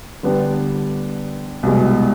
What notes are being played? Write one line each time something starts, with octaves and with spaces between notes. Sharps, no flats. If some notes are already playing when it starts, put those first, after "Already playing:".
D3 G3 B3 D4 G4
C2 B2 G#3